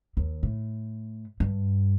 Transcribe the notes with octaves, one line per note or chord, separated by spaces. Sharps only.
D#2
A2
G2